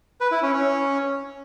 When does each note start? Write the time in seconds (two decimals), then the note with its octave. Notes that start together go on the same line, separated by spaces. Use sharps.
0.21 B4
0.32 E4
0.43 C#4
0.53 C#4